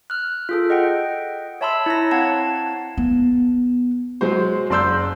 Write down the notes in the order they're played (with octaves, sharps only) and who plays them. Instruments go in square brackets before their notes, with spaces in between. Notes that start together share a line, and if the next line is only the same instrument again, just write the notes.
[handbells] F6 F#6
F4 G#4 A4
D#5 F#5 G5
C#5 E5 A5 B5 C6 E6
E4 C#5 A#5 A#6
C4 F5 F#5 A5 G#6
[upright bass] B3
[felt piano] F#3 G#3 C5
F#1 D5 C6 E6 G6